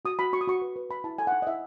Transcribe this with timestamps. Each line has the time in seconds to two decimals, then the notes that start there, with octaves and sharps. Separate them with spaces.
0.05 F#4 D#6
0.19 F#4 B5
0.33 F#4 C#6
0.41 D#6
0.48 F#4 C#6
0.62 B4
0.76 B4
0.90 B4 B5
1.04 E4 A5
1.19 A4 G#5
1.27 F#5
1.32 D#4
1.42 D#5
1.47 E4 E5